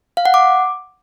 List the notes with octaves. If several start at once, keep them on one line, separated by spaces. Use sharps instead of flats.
F5
F#5
D6